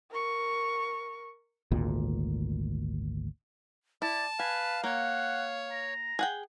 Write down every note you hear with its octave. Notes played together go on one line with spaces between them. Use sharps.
A#4 C#6
G#1 D2 A#2
E4 D5 A5
B4 F5 G#5
A#3 C#5 F#5
A#5
G#4 F#5 G5